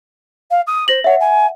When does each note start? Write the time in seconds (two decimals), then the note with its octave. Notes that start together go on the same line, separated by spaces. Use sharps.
0.50 F5
0.66 D#6
0.88 C5 A#6 F#7
1.04 C#5 E5 F#5
1.20 G#5